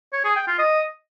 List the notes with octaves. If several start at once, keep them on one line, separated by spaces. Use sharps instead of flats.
C#5
G#4
G5
F4
D#5